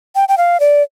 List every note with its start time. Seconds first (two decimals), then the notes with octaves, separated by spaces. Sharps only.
0.15 G5
0.29 G5
0.38 F5
0.60 D5